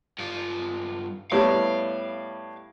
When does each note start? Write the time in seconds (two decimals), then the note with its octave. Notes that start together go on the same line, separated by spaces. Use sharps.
0.19 G2 F4
1.32 A2 G3 B3 F5